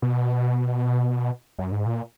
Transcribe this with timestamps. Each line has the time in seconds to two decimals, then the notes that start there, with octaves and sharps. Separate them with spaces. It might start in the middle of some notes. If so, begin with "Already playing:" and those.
0.02 B2
1.58 F#2
1.72 G#2
1.86 A#2